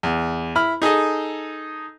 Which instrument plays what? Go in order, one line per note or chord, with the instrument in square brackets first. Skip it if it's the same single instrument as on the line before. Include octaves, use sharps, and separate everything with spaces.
[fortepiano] E2
E4 B5 F6
D#4 G#4 A4 D#5